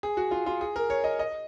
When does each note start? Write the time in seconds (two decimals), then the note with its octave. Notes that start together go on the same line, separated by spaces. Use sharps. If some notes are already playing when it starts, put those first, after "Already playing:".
0.03 G#4
0.17 F#4
0.31 F4
0.46 F4
0.61 G#4
0.76 A#4
0.90 C#5
1.04 D#5
1.19 D#5